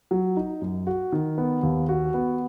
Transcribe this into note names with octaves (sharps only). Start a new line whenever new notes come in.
F#3
D#4
F#2
F#4
D#3
B3
D#2
F#4
B3